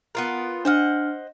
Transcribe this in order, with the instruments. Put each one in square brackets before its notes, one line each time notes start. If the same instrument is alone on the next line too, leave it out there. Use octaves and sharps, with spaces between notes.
[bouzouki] B3 F4 A#4
[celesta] D4 F6 [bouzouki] C5 D#5 F#5